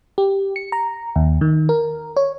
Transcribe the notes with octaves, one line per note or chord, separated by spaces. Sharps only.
G4
C#7
A#5
D#2
D#3
A#4
C#5